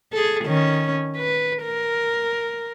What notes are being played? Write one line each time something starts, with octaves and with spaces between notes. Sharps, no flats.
G#4 A4
D#3 C#4
B4
A#4